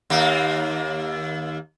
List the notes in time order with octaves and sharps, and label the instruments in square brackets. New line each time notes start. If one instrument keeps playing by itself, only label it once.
[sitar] D#2 A#3